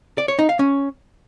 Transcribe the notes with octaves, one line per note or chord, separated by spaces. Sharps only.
D5
C#5
D#4
F5
C#4